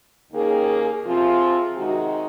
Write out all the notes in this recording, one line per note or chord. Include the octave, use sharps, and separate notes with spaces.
D#2 D#3 A#3 C#4 G#4
C3 F3 C4 F4 G#4
C3 D#3 G#3 D#4 F#4